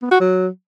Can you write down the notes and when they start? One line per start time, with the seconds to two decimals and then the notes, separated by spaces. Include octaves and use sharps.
0.02 B3
0.11 F#4
0.20 F#3